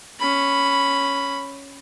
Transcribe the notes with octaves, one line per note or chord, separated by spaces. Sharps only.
C#4 B5